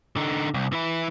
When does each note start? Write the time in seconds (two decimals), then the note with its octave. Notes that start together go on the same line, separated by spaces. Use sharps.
0.16 D3 D#4
0.54 C2
0.73 E3 E4